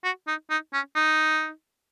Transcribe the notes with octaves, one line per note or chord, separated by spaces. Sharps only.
F#4
D#4
D#4
C#4
D#4